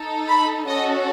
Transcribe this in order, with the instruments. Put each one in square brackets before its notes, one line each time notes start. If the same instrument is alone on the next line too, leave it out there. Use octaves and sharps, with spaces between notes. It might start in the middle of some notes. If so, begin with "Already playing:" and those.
Already playing: [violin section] D#4 A4
B5
C#4 F#4 A4 D#5